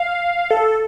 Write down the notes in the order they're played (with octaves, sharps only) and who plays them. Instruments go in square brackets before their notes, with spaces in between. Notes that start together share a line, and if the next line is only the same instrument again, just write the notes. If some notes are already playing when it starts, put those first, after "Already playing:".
Already playing: [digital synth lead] F5
A4